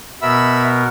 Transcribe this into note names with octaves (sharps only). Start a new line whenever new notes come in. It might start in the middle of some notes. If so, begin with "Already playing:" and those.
B2 B3 A#4 E5 B5 E6